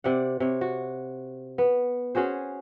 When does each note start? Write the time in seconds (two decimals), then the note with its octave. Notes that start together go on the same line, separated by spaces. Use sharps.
0.04 C3 D5 F#5
0.40 C3 C#5
0.61 F#4
1.58 B3
2.15 C#4 F#4 G#4 C5